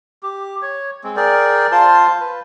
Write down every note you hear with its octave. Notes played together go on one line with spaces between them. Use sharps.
G4
C#5
G#3 C4
G#4 A#4 D5 G5
F4 C5 A5
B4